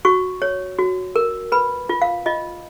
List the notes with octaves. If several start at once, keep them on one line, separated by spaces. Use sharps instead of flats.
F#4 C#6
C#5
F#4
A#4
B4 B5
F4
F5
F4 D#5